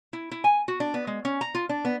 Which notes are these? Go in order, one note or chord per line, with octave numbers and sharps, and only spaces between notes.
E4
E4
G#5
F#4
D4
B3
G#3
C#4
A#5
F4
D4
B3